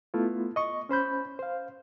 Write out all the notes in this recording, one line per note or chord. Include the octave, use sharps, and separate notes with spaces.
A3 B3 E4 F4
D#5 C#6
C#4 C5 B5 G6
C5 F5